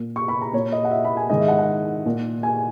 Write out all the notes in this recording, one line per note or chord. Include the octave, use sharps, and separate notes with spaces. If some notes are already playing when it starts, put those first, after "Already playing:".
Already playing: A#2
C#6
B5
A#5
A#2 C#5
D#5
F#5
E5
B5
G#5
G#2 D#3 D#5
E5
F#5
F#5
A#2
G#5